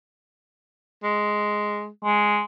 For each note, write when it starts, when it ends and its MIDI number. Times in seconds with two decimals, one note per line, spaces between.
1.03 1.88 56
2.04 2.43 56